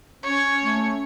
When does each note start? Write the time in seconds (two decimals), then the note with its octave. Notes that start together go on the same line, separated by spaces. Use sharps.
0.23 C#4 C#5
0.63 A3